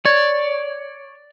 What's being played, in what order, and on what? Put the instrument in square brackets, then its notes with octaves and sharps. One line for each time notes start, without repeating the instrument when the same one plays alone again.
[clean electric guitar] C#5 [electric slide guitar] D5